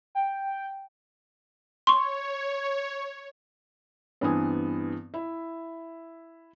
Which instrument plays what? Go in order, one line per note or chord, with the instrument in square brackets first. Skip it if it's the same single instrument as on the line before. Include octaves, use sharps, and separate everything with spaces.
[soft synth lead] G5
[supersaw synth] C#5 [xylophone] C6 C#6
[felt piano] G2 E3 B3 C4 G#5 D#6
E4 E5